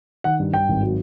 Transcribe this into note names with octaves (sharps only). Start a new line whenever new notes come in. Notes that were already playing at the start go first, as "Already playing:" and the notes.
D#3 F#5
G2
G2 G5
G#1
F#3